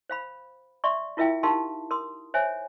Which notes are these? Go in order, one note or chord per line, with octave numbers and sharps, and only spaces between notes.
C5 F5 B5
D5 E5 C6 C#6
E4 F4 A#4 E5 F5 G5
D#4 G4 A#4 F5 A5 C6
A#4 C6 D#6
C5 C#5 E5 G#5